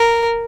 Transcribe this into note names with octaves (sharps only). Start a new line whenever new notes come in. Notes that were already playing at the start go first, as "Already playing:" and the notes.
Already playing: A#4